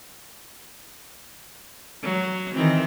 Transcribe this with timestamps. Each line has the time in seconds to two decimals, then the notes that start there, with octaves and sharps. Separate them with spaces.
2.03 F#3
2.54 D#3 E3 C4